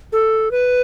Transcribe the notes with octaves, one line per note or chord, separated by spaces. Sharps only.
A4
B4